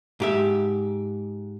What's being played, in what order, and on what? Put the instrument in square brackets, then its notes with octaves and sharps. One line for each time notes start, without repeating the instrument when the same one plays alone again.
[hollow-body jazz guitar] G#2 G4 E5